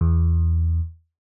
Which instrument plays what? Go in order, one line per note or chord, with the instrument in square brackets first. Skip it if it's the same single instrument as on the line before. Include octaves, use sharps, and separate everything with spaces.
[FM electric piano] E2